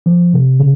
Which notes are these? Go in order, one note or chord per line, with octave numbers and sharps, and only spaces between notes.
F3
C3
C#3